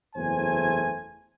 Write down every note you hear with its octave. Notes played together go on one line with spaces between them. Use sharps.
F#1 E2 A3 C5 G#5